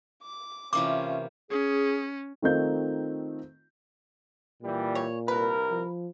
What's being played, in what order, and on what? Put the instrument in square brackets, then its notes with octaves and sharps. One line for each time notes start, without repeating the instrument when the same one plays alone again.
[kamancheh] D6
[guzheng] C3 E3 A#3 [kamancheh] C#4 F4 [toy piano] D6
[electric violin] C#4 [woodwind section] G#4
[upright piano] D#3 A3 C4 D#4 F4 G6
[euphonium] A#2 [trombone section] E3 G3
[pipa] C#5
[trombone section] C2 A#4 [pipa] B4
[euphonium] F3